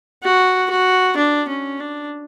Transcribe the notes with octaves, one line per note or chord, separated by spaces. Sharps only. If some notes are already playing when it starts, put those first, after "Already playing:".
F#4
F#4
D4
C#4
D4